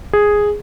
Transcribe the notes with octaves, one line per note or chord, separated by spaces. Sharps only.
G#4